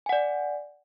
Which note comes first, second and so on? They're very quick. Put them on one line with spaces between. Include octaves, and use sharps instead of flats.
G#5 F#5 D5